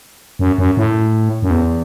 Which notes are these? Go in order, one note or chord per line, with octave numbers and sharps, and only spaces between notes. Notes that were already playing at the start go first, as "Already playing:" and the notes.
F#2
F#2
A2
F#2
E2